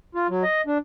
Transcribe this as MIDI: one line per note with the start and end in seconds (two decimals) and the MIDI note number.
0.15 0.27 65
0.29 0.43 54
0.43 0.61 75
0.67 0.78 62